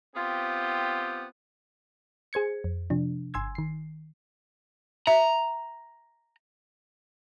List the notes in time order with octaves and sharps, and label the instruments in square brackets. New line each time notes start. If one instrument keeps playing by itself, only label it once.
[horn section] B3 C4 F4 G4
[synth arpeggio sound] G#4 C5 G#6 C#7
F2
C3 F3 D4
G1 G#5 C6 E6 G#6
D#3 C7
[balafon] E5 [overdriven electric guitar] A#5